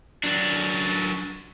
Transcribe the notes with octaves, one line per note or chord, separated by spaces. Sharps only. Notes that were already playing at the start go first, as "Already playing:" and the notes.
F#3 D4